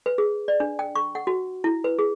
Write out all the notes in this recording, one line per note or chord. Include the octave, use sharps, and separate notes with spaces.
B4
G#4
D5
D4
G5
C#6
F#5
F#4
E4
B4
G#4